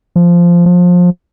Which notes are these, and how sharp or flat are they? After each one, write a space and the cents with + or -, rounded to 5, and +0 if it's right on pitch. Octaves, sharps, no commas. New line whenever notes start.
F3 -10
F3 +25